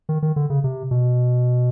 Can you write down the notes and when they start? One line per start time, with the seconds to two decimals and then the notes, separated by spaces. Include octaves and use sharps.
0.09 D#3
0.23 D#3
0.36 D3
0.50 C#3
0.64 C3
0.91 B2